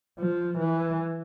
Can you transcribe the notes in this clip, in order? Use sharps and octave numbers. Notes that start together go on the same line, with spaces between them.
F3
E3